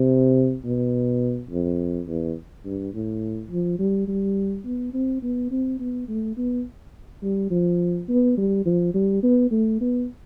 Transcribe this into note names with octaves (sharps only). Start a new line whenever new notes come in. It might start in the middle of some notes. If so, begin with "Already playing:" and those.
Already playing: C3
B2
F2
E2
G2
A2
F3
G3
G3
B3
C4
B3
C4
B3
A3
B3
G3
F3
B3
G3
F3
G3
B3
A3
B3